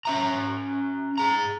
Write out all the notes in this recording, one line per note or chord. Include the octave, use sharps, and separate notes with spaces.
C#4 E5 A#5
G#4 A#5